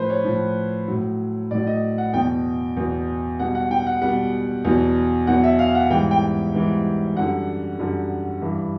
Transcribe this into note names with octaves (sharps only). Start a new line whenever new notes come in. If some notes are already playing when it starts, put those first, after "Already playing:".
Already playing: A2 F3 B4 C5
C#5
A2 F3
A2 F#3
A2 F#3 D5
D#5
F#5
E2 B2 F#3 G5
E2 B2 F#3
B2 G3 F#5
F#5
G5
F#5
B2 G3 F#5
E2 B2 F#3
E2 B2 F#3 F#5
E5
F5
F#5
G#2 E3 G3 G5
G5
G#2 E3 G3
F#2 D3 G3 F#5
F#2 D3 G3
G2 E3 G3